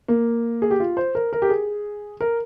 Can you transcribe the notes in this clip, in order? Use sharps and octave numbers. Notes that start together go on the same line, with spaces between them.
A#3
G#4
G4
F4
C5
A#4
A#4
G4
G#4
A#4